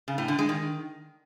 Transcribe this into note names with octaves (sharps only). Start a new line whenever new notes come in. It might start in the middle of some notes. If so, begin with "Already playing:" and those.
C#3
A2
D3
G#3
D#3